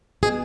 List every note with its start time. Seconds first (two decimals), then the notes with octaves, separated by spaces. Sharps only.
0.23 B2 G#4